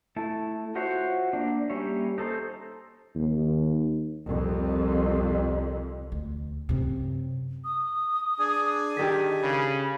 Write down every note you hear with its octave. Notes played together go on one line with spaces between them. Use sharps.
A3 E4 A5
F4 F#4 C5 C#5 E5
A#3 D4
G3 A#3 C#4 C#5 E5
D#4 A4 C5
D#2
C2 F2
D2
F#2 C3
D#6
D4 G#4 G#5
D#3 G4 A4 B6
C#3 B5